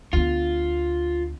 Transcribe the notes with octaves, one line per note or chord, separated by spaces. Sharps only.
D2 B3 F4